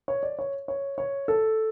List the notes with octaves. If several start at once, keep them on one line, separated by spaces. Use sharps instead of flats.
C#5
D5
C#5
C#5
C#5
A4